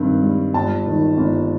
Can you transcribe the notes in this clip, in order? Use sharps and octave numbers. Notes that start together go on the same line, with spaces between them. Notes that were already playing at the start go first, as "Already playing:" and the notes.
Already playing: G2 D#3 C4
G3
G1 A5
D#3
G1